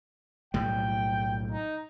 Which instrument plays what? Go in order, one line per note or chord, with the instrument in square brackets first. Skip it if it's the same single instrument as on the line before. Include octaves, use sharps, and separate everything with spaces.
[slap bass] B1 A2 G3 [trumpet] G5
[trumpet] D#4